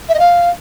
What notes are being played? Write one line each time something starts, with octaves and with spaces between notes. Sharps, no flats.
E5
D#5
F5